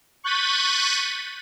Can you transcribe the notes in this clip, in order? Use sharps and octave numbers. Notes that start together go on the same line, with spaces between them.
C#6 F#6 G6 A6 B6 D#7